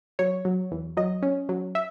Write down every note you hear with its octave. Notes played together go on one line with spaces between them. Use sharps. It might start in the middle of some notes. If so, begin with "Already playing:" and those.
F#3 C#5
F#3
E2
F#3 D#5
C#4
F#3
E5